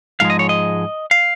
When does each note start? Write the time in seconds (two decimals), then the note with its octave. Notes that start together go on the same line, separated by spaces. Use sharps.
0.20 G#2 F3 G#3 F5
0.30 D#5
0.39 C#5
0.49 D#5
1.11 F5